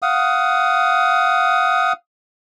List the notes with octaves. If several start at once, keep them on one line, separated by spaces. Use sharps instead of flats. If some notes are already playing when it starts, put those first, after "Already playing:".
F5 F#5 D#6